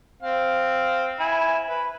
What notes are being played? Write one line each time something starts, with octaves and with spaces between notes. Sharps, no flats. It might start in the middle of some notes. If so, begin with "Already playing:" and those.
C4 F5
E4 G#5
B4